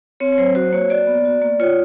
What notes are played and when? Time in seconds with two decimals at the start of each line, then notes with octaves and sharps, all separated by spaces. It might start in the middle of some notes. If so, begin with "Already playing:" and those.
0.20 C4 C#5
0.32 C#5
0.38 F#3 C5
0.55 F#4 C5
0.72 A#3 C#5
0.90 F#4 D5
1.07 B3
1.25 F#4
1.42 A#3
1.60 F4 C#5